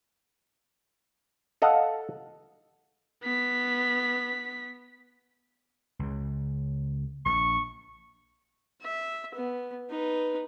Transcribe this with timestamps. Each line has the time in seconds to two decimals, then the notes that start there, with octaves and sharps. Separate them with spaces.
1.62 A4 D#5 F5 F#5
3.23 B3 B6
5.99 C#2 C#3
7.26 A#1 C#6
8.82 E5
9.35 B3
9.90 D#4 B4